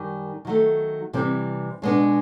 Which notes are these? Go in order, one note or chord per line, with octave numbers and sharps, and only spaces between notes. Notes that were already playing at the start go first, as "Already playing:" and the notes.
Already playing: F#2 D#3 G3
D#3 F#3 A3
C3 E3 G3 C4
B2 G#3 B3 D4